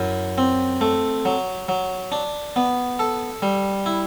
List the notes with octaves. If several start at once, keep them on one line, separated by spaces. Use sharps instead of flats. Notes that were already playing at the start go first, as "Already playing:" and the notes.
Already playing: F#2 E4
C4
A3
F#3
F#3
D4
B3
A4
G3
E4